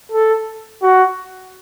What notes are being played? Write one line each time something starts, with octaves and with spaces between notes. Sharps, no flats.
A4
F#4